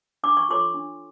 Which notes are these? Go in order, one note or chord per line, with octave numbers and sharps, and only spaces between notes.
D4 D6
C#6
F4 A4 C#5 C6 D6
D4